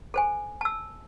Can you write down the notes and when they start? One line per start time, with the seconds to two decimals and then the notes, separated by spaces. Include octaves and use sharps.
0.14 A4 C5 G#5
0.61 A5 E6